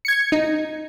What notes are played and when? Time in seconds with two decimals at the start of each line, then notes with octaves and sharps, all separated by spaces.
0.05 G#6 C#7
0.32 D#4